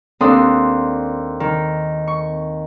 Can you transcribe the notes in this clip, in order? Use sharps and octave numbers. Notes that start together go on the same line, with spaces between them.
D#2 C4 D4 A4 C6 D#6
D#3
C#6